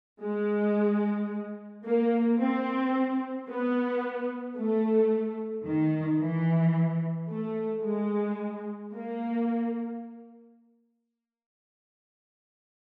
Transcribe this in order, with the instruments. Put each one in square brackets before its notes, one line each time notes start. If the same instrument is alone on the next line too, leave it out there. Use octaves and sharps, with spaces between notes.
[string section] G#3
A#3
C4
B3
A3
D#3
E3
A3
G#3
A#3